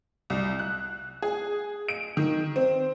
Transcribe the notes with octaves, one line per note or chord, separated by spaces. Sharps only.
C2
F#6
G#4
D7
D#3
C4